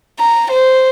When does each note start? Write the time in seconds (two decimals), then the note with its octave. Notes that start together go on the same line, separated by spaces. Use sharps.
0.19 A#5
0.50 C5